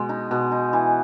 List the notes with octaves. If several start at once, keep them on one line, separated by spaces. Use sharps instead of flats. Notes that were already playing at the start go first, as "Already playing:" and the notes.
Already playing: B2 G#3
D#4
B2
D#4
E3